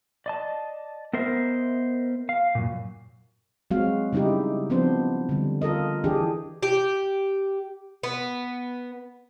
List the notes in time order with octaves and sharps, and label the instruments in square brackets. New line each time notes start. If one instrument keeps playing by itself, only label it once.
[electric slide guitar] D5 D#5 A5
B3 A#4 C5 D#5 E5
F5
F#2 A#2
[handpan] F#3 G#3 C4 F#4 F5
C#3 G3 D#4 E4 G4
F3 B3 C4 D4 C5
D3 G3
F4 A4 A#4 D#5
E3 D4 G4 G#4
[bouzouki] G4
B3